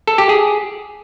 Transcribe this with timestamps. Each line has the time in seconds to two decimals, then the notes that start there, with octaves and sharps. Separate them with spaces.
0.07 A4
0.18 G4
0.29 G#4